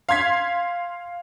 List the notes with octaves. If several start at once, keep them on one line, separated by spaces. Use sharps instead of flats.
F5 C6 G#6 B6